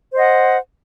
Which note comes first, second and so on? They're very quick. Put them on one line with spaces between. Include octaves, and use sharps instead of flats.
C5 D#5 F#5